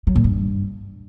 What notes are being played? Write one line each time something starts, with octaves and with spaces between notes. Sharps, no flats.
F#3
A#2
G2